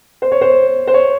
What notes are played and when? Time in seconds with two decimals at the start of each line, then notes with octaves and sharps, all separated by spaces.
0.22 C5
0.32 C#5
0.41 C5
0.87 C5
0.94 C#5